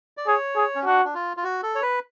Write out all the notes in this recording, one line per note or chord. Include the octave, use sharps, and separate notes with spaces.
D5
G#4 C#5
G#4
C#4
D4 F#4
D4
F4
F4
F#4
A4
C#5
B4